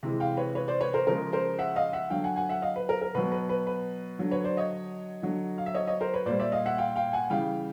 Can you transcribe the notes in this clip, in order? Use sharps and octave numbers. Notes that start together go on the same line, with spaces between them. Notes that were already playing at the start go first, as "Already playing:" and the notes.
C3 E3 G#3
F5 G5
B4 C#5
B4 C#5
C5 D5
B4 C#5
A#4 C5
C#3 F3 G#3 A#4
A#4 C5
E5 F#5
D#5 F5
E5 F#5
D3 F#3 F5 G5
F#5 G#5
F#5 G#5
E5 F#5
D#5 F5
B4
A#4
A#4
B2 F#3 B4
B4
B4
B4
D3 F#3
B4 C#5
C5 D5
C#5 D#5
D3 F#3
F5
E5
C#5 D#5
C#5 D#5
A#4 C5
B4 C#5
A#2 G3 C5 D5
D5 E5
D#5 F5
E5 F#5
F5 G5
F5 G5
F#5 G#5
C#3 E3 G3 F5 G5